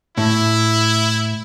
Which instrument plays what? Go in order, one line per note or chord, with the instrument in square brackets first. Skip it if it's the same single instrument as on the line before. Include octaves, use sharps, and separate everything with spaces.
[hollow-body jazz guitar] A2 [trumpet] E4